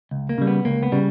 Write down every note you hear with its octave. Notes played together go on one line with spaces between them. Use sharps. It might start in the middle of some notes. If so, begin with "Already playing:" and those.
C#2
A#3
C#3 G3
B3
C#2 A#3
B3
C#3 G3